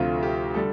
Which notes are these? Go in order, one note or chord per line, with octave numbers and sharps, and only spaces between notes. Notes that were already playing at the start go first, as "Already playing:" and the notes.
Already playing: D2 C3 F3 A3 F4
G4
D3 G3 A4